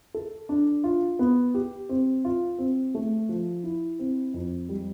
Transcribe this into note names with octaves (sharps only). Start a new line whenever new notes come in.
A4
D4
F4
B3
G4
C4
F4
C4
A3
F3
E4
C4
F2
G3